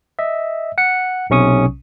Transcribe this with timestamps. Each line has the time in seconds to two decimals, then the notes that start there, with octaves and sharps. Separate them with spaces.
0.19 D#5 E5
0.78 F#5 C#7
1.30 B1 C3 C#4 C#6 D#6